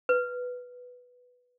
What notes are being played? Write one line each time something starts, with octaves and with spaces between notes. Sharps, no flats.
B4